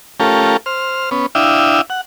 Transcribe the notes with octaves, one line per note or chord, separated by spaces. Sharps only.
A3 C#4 F4 G4 A4 A#4
C5 F6
B3 C#4
D4 E4 E5 F5 G5 D#6
F#5